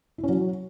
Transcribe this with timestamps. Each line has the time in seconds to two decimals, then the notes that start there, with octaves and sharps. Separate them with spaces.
0.18 E4
0.23 C#4
0.29 F#3